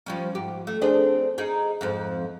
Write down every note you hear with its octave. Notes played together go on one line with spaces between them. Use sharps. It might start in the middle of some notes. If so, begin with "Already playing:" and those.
F3 G3 C#4
G#2 G4
A3
C4 D4 G#4
D#4 G#4 A#4
F2 G#2 F3